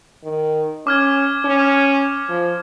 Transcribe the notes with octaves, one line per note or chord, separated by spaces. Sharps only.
D#3
C#4 D6 F6 G#6
C#4
F3